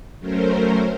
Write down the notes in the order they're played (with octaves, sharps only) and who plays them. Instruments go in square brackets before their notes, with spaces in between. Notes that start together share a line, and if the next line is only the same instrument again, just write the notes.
[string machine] F#3 A3 C#4 A#4 C5